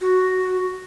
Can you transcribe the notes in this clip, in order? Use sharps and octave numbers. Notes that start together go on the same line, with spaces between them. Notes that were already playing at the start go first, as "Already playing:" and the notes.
F#4